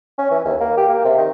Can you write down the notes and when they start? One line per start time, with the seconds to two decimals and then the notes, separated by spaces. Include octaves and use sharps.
0.18 C#4
0.31 E3
0.45 D#2
0.60 A#3
0.77 G4
0.89 A#3
1.04 C3
1.18 D#3